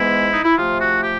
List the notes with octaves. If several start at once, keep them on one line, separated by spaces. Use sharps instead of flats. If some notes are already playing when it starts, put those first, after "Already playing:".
Already playing: G#2 E3 G#3 B3 E4
D#4
E4
C3 F3 A3 F4
F#4
G4